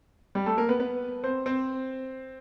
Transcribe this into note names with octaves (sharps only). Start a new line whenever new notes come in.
G3 G4
A3 A4
A#3 A#4
B3 B4
B3 B4
C4 C5
C4 C5